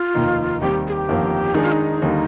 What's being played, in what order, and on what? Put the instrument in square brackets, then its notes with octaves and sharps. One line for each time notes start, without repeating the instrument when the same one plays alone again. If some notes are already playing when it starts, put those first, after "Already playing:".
Already playing: [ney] F4
[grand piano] F1 D#2 D#3 A#3 D#4
[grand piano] D#2 D#3 G3 C4 [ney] G4
[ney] G#4
G4
[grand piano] G1 F2 D#3 A#3
[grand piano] D#3 G#3 D4 G#4 [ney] D#4
[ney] F4
D#4
[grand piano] D#2 D3 G3 A#3